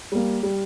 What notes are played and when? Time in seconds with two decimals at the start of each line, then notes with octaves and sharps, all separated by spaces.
0.12 G3 A#3
0.43 G3